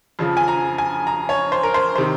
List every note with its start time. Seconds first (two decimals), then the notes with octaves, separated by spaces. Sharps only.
0.19 F2 C#3 F3
0.37 G#5
0.48 A#5
0.78 G#5
1.07 A#5
1.29 C#5
1.52 C5
1.63 A#4
1.74 C5
1.96 C3 D#3 C5